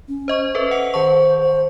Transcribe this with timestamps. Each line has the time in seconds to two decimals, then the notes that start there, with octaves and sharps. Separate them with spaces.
0.08 C#4
0.28 C5 D#5 C#6
0.55 A4 B4 E5
0.71 F#5 C#7 F7
0.94 D#3 C5 A5 C#6
1.41 C5